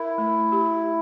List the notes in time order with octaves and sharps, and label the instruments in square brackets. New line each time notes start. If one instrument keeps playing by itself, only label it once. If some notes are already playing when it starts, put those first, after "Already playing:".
Already playing: [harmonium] E4 [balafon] A#4
[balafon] A3
G4